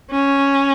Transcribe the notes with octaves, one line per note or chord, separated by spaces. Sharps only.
C#4